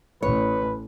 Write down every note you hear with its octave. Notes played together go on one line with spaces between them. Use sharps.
A1 B4 C#5